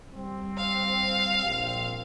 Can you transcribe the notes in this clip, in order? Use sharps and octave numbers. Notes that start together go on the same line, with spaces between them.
G3 C4
F5
A#1 C4